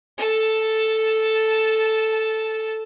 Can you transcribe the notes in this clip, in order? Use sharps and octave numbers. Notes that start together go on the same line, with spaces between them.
A4 A5